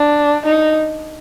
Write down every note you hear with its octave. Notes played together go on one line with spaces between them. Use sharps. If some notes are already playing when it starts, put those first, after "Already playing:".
Already playing: D4
D#4